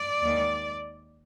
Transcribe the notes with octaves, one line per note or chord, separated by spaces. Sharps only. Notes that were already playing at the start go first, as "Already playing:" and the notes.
Already playing: D5
D#2 D#3 G#3